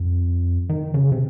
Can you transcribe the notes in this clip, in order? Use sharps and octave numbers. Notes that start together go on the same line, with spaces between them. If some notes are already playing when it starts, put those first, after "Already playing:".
Already playing: F2
D#3
C#3
C3